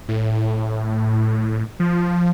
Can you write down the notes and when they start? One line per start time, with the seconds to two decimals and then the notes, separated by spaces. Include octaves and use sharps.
0.09 A2
1.80 F3